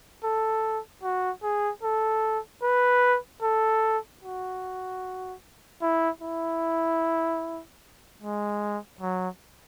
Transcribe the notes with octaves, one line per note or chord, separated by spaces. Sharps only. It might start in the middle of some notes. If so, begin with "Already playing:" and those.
A4
F#4
G#4
A4
B4
A4
F#4
E4
E4
G#3
F#3